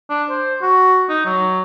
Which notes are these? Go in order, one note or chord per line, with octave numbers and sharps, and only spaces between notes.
D4
C5
F#4
D#4
F#3